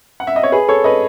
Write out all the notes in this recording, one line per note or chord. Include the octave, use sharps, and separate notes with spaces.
F#5
E5
D#5
C#5
G#4 B4
A4 C#5
B4 D#5